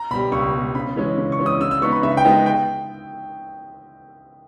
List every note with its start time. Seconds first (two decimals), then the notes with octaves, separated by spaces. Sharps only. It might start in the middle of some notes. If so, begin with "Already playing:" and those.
Already playing: A#5
0.11 B2 G3 B5
0.32 C#2 C#6
0.54 B2 G3
0.75 C#3 B5
0.96 E3 G#3 C#4
1.18 C#3
1.32 C#6
1.39 E3 G#3 C#4
1.46 D#6
1.61 C#3 E6
1.71 E6
1.82 G#3 B3 D#4 C#6
1.92 B5
2.03 C#3 E5
2.17 G5
2.24 G#3 B3 D#4
2.46 G5